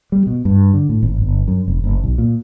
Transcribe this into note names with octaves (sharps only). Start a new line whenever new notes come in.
G3
B2
G2
D3
A2
G#1
G1
F#2
F1
F#1
B1
A#2